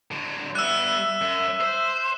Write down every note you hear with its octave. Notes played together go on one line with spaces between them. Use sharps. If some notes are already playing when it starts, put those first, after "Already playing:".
D3 F#3
G3 B3 E5 E6 F#6
F#2
C5